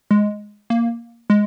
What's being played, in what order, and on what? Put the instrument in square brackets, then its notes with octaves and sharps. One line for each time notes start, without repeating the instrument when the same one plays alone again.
[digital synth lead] G#3
A#3
G#3